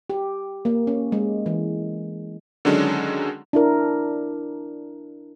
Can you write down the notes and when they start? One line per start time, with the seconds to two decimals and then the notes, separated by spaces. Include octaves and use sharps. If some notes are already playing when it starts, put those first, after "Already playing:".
0.10 G4
0.65 A#3
0.87 C#4
1.12 G#3
1.46 E3
2.65 D3 D#3 F#3 G#3 C#4 D4
3.53 D4 E4 A#4